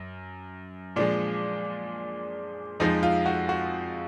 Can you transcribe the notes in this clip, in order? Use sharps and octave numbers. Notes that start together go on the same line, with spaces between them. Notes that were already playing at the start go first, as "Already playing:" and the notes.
Already playing: F#2
A#2 F3 G#3 D4
F2 F3 G#3 D#4
F4
F#4
F#4